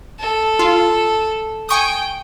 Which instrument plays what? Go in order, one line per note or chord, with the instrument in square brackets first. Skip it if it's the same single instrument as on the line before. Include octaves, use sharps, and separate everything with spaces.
[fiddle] A4
[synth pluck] F4
[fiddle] G5 [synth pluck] G#5 C#6 D#6